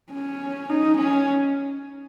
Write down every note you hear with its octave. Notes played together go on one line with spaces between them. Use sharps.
C#4
D#4
C#4